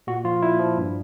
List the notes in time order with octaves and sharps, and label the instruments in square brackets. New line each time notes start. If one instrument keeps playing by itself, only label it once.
[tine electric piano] A#2 F#4
F3 F4
A#2 E4
F3
G2